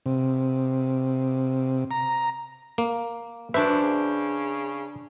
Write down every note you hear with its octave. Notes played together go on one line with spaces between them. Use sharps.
C3
A#5
A#3
F#2 D4 B4 C5 E5
C#3